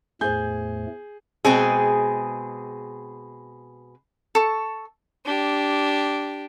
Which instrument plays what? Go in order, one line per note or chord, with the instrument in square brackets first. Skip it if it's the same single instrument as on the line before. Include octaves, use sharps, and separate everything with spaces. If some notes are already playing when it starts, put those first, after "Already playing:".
[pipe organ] E2 A2 A3 [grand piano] G#4 G6 [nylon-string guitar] C5 G#5
[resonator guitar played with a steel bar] B2 G#3 C4 G#4
[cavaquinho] A4 C#6
[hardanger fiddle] D4 G4